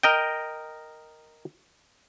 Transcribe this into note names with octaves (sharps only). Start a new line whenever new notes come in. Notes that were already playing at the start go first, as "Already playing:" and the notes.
A#4 D#5 G5